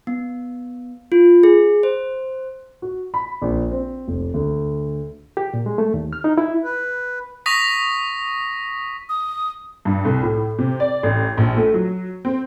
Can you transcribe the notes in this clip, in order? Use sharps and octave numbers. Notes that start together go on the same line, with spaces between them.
B3
F4
G#4
C5
F#4
B5
A#1
C4
F1
D2
G4
A#2
G#3
A3
D#2
F6
D#4
E4
B4
C#6 D#6 A#6 B6
D#6
G2
C2
A2
C3
D5
A1
A#1
A3
F#3
C4